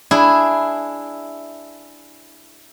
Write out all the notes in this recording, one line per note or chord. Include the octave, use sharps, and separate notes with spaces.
D4 E4 G#4